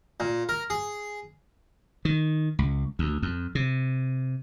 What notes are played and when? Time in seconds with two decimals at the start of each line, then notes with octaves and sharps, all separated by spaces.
0.20 A#2
0.49 A#4
0.70 G#4
2.05 D#3
2.59 C#2
2.99 D2
3.22 F2
3.55 C3